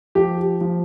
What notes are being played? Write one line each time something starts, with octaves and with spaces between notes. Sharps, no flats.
F3 G4
F3